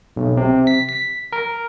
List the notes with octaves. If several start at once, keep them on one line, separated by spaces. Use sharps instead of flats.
B1
C3
B6
B6
A#4